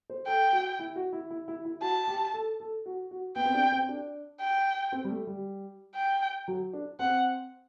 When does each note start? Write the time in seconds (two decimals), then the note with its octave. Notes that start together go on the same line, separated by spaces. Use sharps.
0.10 C5
0.27 A4 G5
0.53 F#4
0.79 E4
0.96 F#4
1.13 E4
1.30 E4
1.48 E4
1.65 E4
1.82 F#4 A5
2.08 G4
2.34 A4
2.60 A4
2.86 F#4
3.11 F#4
3.36 B3 G5
3.45 C4
3.54 D4
3.72 C4
3.88 D4
4.40 G5
4.92 C4
5.05 G3
5.10 A3
5.27 G3
5.95 G5
6.48 F#3
6.73 D4
6.99 C4 F#5